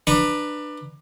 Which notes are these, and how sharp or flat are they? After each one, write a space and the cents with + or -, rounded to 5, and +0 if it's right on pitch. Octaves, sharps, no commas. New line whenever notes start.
D4 +20 B4 +0 A#5 +0